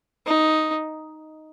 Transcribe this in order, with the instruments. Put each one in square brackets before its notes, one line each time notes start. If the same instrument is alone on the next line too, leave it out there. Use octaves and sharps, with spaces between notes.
[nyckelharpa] D#4